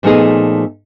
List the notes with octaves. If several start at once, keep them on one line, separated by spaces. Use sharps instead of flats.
A#2 F3 A3 B3 D#4 G#4